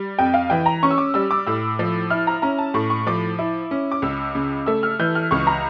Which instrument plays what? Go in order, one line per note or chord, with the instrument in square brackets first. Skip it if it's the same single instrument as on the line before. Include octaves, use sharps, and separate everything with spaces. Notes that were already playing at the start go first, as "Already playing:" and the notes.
Already playing: [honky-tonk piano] G3
F2 G5
F5
E3 G5
A#5
C#4 C#6
E6
D6
G3 E6
D6
A2 E6
F3
E4 F6
A#5
C#4 A#5
A5
A2 C#6
C#6
F3 D6
E4
C#4
D6
C#2 E6
C#3
A3 E6
F6
E3 G6
F6
C#2 C#6
A#5